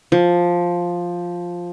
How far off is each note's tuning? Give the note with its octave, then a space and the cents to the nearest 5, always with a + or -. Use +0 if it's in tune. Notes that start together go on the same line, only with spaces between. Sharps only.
F3 +5